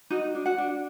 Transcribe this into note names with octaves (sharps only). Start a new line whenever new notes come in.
D#4 F#4 D#5
D4
F#4 F#5
D4